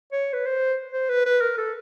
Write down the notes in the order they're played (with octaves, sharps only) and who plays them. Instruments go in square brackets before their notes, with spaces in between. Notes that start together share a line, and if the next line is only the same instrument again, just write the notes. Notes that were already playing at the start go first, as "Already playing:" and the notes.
[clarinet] C#5
B4
C5
C5
B4
B4
A#4
A4